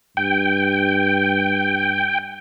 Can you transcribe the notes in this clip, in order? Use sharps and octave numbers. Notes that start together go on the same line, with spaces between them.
G2 G5